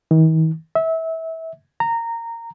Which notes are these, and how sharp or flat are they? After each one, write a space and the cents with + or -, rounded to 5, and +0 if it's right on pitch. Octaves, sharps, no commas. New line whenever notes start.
D#3 +45
E5 -25
A#5 -15